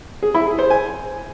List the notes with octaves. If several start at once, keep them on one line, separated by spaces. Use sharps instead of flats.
G#4
E4
G#4
C5
G#5